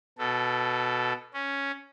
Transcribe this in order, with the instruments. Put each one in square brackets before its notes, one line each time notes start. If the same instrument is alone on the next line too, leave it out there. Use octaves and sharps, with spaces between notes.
[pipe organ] B2 A4
C#4